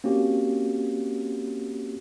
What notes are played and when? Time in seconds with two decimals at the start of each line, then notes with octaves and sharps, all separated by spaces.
0.04 A#3 C4 C#4 F#4 G4